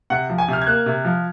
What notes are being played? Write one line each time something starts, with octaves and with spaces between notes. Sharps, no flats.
C3 F#5
F3
G#5
C3 F6
G#6
A#3 F#6
C3
F3